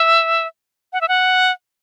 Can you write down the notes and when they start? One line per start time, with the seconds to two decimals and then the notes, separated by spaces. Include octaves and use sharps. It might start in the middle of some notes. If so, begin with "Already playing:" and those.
Already playing: E5
0.93 F#5
1.01 E5
1.08 F#5